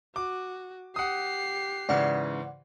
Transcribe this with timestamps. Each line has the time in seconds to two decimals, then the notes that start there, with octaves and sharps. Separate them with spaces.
0.16 F#4 D6
0.96 G4 F#5 D#6 C7
1.89 G#2 C#3 E3 D5 F#5